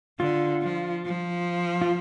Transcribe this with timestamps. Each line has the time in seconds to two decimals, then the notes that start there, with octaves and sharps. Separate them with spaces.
0.20 D3 F4
0.62 F3
1.06 F3
1.82 F4